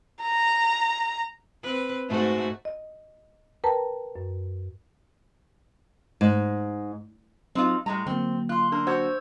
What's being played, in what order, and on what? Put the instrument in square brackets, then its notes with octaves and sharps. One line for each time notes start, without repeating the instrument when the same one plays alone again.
[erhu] A#5
[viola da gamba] C4 B4
G#2 A3 F#4
[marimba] D#5
A#4 B4 G5 A5 A#5
F#2
[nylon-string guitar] G#2
[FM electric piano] F#3 [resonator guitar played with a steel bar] C4 D#4 F4
[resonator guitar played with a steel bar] A2 G#3 A#5 [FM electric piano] G3
[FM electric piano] D3 F#3 A#3 [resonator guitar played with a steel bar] C4
[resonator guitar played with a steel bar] F4 [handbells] C6 F#6
[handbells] D4 [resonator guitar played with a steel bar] A#4
[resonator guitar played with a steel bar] F#4 [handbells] C5 E6 G#6